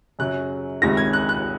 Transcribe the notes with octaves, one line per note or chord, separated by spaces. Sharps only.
F#2 C#3 F#3 F#6
C#2 C3 D#3 A#6
G#6
F#6
F#6